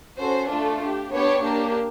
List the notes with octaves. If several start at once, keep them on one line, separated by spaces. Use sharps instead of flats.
C#4 F#4 A4 C5
A3 D4 F4 A4
D4 G4
B3 D4 G4 C#5
A#3 D4 G4